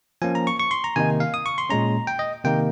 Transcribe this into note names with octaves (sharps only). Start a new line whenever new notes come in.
F3 A#3 C#4 G#5
A#5
C#6
C#6
C6
A#5
C3 D#3 A#3 D#4 G#5
F5
D#6
C#6
C6
A#2 G#3 C#4 A#5
G5
D#5
C3 D#3 A#3 D#4 G5